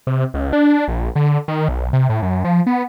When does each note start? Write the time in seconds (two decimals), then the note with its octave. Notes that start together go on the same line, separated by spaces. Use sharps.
0.07 C3
0.34 C#2
0.53 D4
0.88 A#1
1.16 D3
1.48 D#3
1.68 B1
1.93 C3
2.09 A2
2.22 F#2
2.45 F3
2.66 B3